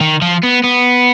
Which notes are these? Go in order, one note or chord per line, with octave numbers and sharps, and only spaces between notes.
D#3
F3
B3
B3